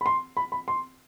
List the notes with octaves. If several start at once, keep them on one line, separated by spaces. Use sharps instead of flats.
B5
C6
B5
B5
C6